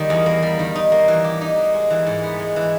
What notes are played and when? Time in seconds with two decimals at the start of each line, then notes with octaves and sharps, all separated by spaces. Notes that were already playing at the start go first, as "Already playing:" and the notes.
Already playing: D#3 G3 A#3
0.10 E2
0.26 A#3
0.42 G3
0.59 D#3
0.76 D#4
0.92 A#3
1.08 E3
1.24 G4
1.41 D#4
1.58 A#3
1.74 G#3
1.90 E3
2.06 G#2
2.23 B3
2.39 G#3
2.56 E3